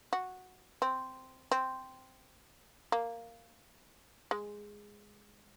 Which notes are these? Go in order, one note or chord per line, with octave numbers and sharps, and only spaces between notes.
F#4
C4
C4
A#3
G#3